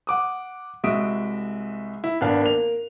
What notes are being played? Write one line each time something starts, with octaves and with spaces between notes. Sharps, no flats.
F#5 D6 D#6
C2 G#3 F#4 E5 D#6 D7
E4
G#1 A#3 B3 D4 F5 A5
A#3 F7